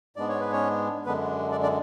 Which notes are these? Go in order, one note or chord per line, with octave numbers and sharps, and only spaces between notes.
G#2 G#3 B3 D4 D5
C#5
B4
C#4 C#5
F#2 D3 G#3 B3 D4 B4
D4 D5
D4 D5